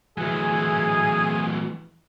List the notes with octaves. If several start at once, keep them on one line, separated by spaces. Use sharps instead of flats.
E3 F#3 A3 G#4 G#5